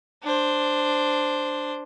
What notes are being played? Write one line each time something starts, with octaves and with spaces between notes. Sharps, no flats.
D4 C5